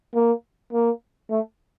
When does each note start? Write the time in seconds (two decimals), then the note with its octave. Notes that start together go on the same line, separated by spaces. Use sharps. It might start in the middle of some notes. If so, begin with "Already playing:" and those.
0.15 A#3
0.73 A#3
1.31 A3